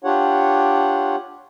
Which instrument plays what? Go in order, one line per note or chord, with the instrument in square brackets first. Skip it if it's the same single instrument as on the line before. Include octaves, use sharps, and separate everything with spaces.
[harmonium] D4 F4 G4 C#5 F#5